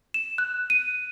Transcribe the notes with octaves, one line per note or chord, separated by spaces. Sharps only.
E7
F#6
D#7